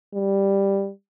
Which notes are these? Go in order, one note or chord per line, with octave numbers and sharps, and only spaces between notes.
G3